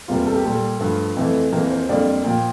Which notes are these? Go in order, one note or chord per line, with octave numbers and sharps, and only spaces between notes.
E2 C3 G3 A#3 F4
G4
A4
G4
A#2 G3 A#3 A4
G2 F3 A3
F2 E3 A3
F2 E3 A#3 A#4
C5
F2 D3 G3 A#3 D5
A#2 F3 A#3 G5